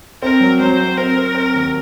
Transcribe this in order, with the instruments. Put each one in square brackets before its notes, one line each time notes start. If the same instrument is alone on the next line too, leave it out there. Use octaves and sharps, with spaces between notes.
[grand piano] C4 [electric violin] A#4
[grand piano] F#3
[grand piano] F#3 [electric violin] C5
[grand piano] C4
[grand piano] C4 [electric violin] A#4
[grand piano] C4
C4
D#2